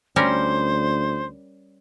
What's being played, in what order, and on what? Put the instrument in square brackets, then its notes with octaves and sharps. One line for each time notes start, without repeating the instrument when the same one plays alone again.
[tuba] D2 [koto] G3 C#4 A#4 [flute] C5